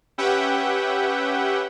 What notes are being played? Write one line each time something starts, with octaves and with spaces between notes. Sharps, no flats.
C#4 G4 B4 E5 F#5 G5